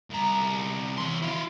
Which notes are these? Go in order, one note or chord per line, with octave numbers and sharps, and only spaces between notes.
C2 A#5
E2 C6
E4 F5